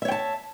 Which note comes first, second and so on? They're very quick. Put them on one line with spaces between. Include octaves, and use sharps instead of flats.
E5 C#5 G5 A5